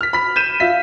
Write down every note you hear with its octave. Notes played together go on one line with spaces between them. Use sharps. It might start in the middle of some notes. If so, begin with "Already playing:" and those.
F6 B6
B5 B6
G6 D#7 E7
F4 E5 B6